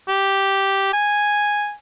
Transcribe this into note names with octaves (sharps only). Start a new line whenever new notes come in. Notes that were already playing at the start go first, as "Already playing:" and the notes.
G4
G#5